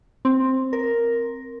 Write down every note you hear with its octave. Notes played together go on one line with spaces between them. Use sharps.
C4
A#4